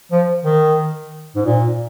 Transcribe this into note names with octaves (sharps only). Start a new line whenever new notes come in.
F3
D#3
G#2
A#2